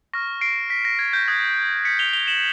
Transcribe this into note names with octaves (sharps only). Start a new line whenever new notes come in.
C#6 F6 A#6
C7 D7
B6
A#6
G#6
G6
D#6 F#6 G#6
B6 C#7
F7 G7
F7 G7
E7 F#7